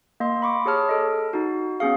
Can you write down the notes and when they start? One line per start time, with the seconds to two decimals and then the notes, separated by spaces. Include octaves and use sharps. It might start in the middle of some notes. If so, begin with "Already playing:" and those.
0.20 A#3 D#5 C6
0.42 B5 C#6 D6
0.66 G4 G#4 C#5 A5 F6
0.89 A4 D#5
1.33 D#4 F#4
1.80 B3 C#4 G#4 F5